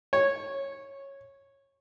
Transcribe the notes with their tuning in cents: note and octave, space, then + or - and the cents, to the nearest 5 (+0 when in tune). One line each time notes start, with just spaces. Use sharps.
C#5 -10